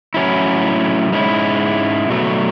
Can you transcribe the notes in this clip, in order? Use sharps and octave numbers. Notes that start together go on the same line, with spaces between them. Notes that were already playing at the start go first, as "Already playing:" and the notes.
A2 F#3 C#4 E4
G#2 G#3 C#4 E4
B2 F#3 A3